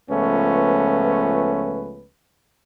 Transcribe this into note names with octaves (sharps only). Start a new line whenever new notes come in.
C#2 F3 A3 B3 C#4 B4